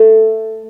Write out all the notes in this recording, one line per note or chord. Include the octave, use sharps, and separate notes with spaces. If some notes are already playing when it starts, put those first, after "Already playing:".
Already playing: A3